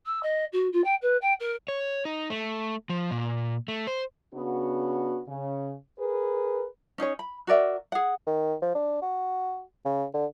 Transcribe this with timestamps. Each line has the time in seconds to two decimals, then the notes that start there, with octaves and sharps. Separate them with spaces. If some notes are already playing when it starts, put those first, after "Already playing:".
0.06 E6
0.23 D#5
0.52 F#4
0.73 F4
0.84 G5
1.02 B4
1.21 G5
1.40 A#4
1.68 C#5
2.05 D#4
2.30 A3
2.89 F3
3.11 A#2
3.68 A3
3.87 C5
4.34 C#3 B3 D4 F#4
5.28 C#3
6.00 G#4 A#4 B4
6.98 C#4 D#4 G#4 C#5
7.19 B5
7.47 F#4 A#4 D5 E5
7.92 G#4 F#5
8.27 D#3
8.62 F3
8.75 D4
9.02 F#4
9.85 C#3
10.14 D3